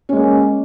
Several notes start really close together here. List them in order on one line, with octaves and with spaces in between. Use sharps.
C#4 G#3 A#3